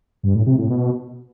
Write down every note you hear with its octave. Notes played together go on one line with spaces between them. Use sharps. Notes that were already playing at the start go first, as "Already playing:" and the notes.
G2
A2
C3
A2
B2